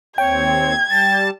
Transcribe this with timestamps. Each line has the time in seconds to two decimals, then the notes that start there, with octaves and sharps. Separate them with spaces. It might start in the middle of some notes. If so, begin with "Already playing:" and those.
0.18 D#2 C4 C#5 G5 G#6
0.90 G3 A5 A6